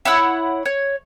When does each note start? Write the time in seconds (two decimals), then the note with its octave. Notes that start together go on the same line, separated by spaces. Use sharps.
0.05 E4 C#5 F#5 E6
0.66 C#5